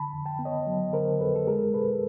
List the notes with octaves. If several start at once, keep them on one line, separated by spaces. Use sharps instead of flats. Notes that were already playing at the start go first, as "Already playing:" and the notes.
Already playing: D3 A5 B5
F2
G5 A5
B3
C#5 D#5
F#3
D3 A#4 C5
F2 A4 B4
A4
G#3 G#4 A#4
B2 A4 B4